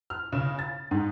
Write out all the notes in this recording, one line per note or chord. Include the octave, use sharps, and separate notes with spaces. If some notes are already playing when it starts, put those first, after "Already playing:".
F6
C#3
A6
G#2